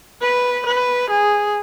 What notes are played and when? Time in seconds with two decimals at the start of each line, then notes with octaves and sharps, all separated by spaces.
0.22 B4
0.67 B4
1.11 G#4